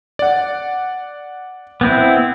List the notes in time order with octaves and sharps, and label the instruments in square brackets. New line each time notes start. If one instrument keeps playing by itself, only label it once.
[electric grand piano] D5 F#5
[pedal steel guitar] B3 C4 E4